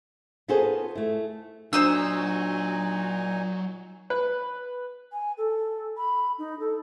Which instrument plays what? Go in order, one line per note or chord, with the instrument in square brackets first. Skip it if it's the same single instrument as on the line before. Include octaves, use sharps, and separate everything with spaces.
[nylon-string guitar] B3 F4 F#4 G#4 A4 C5
A3 E4
[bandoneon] A#2 D#4 G#5 [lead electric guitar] F#3 [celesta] D4 [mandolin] C5 D#6 E6
[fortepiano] B4
[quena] G#5
A4
B5
D#4
A4